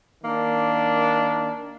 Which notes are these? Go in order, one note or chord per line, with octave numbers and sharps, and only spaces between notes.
D#3 A#3 D4